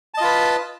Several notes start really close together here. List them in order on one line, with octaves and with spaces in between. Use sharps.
A5 D#5 F4 B4